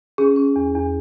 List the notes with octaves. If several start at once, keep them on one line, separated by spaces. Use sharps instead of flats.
C#4 G#4
C#4
E2
E2